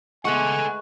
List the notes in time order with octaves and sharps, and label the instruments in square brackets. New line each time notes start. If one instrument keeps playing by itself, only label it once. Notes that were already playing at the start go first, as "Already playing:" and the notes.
[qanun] G#3 A3 B3 [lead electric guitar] A4 F#5 [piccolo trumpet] G#5 [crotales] C#6 F#6